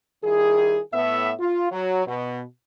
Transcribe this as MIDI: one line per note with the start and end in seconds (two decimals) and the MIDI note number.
0.24 0.80 51
0.24 0.80 55
0.24 0.80 64
0.24 0.80 68
0.93 1.32 45
0.93 1.32 59
0.93 1.32 76
1.40 1.71 65
1.71 2.02 54
2.06 2.42 47